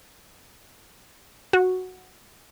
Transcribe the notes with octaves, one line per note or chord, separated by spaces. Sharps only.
F#4